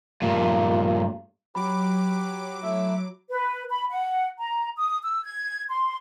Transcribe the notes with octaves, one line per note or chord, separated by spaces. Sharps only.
G2 A#2
F#3 G4 B4 B5 D6
A3 E4 E5
B4
B5
F#5
A#5
D#6
E6
G#6
C6